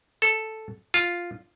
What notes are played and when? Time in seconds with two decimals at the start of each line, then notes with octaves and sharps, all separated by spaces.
0.22 A4
0.94 F4